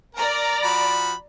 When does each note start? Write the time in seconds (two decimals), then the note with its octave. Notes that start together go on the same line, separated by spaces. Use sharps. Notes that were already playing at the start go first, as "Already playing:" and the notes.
0.15 A#4 D5 A#5
0.63 F3 F#4 B5